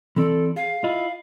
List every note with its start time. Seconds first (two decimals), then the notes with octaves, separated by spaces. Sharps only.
0.16 E3 C4 A4 D5
0.56 G#4 F5
0.84 E4 F4 D#5